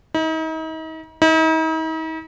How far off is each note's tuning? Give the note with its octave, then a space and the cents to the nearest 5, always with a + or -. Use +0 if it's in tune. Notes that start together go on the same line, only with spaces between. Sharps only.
D#4 +40
D#4 +45